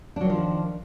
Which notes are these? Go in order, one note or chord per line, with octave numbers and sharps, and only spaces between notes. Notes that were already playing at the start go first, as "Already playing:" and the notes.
D#3 F3 F#3 D4